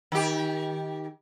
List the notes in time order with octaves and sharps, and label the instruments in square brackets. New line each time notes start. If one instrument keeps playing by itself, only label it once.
[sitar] D#3 G4